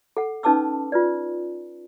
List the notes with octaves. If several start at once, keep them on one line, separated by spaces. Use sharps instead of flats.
A4 F#5
C#4 D#4 B4 A5 D6 E6
F4 B4 D5